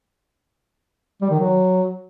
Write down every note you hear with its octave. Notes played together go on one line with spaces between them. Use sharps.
G3
D#3
F#3